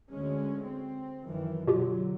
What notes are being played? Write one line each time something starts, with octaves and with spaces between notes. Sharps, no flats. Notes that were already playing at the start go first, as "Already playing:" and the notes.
D2 G#3 C#4
C4
F#2 D#3 E3
B2 D3 F#3 F4 G4